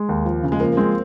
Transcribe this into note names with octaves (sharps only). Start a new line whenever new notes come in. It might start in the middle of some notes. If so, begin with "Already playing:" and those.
Already playing: G#3
D#2
F3
C#3
G#3
F3 A#3
A#3
G#3 C4